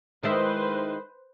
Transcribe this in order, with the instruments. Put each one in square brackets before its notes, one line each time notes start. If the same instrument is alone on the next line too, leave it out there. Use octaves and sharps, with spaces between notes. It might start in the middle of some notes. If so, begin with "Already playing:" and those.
[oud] D#3 G#3 E4 [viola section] B4 C5